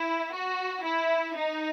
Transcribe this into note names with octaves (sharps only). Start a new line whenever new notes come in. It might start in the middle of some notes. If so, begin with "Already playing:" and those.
Already playing: E4
F#4
E4
D#4